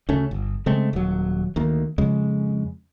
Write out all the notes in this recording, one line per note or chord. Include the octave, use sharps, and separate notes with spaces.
D2 C#3 A3 C#4
G1
C#3 G#3 A3 C4
D#1 F#3
D2 D#3 A#3
F2 C#3 G#3